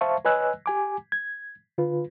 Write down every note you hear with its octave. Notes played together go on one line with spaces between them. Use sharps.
C5 E5 F5 A5 C#6
B4 C#5 D#5 G#5 E6 F#6
G4 G#5 D6
G#6
D3 F4 B4